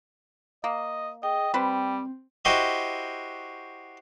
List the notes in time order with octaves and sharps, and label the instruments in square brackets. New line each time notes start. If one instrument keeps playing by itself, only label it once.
[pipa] A#3 [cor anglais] D#5
[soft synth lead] G#4 [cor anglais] D#5 [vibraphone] G5
[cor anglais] G3 [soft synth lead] C4 [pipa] B4 C5
[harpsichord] E4 F#4 G4 C5 D#5 E5